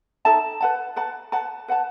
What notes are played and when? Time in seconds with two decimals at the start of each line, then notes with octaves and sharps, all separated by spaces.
0.25 D#4 A4 E5 A5
0.61 B4 F#5 A5
0.96 B4 F#5 A5
1.32 B4 F#5 A5
1.68 B4 F#5 A5